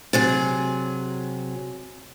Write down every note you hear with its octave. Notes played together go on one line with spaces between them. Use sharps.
C3 F#3 G#4